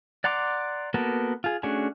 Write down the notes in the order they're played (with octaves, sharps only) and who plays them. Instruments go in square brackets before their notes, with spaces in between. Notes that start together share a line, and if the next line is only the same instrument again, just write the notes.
[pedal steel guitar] D5 F#5 A#5 C6 D6
A#3 B3 F#4 A4 A#4
F4 G#4
A3 C#4 D4 F#4 G#4